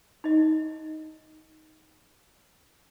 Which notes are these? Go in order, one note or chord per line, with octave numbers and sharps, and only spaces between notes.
D#4 D#5